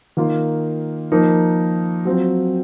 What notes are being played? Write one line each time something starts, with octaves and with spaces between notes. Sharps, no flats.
D#3 A#3 F4
F3 A#3 D#4
F#3 C4 F4